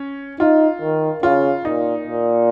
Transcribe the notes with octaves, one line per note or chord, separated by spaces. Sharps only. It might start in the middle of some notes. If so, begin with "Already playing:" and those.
Already playing: C#4
D#4 F4
D#3
C#3 F4
A#2 D#4
A#2